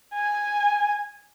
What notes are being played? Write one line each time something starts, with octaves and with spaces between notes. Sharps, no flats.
G#5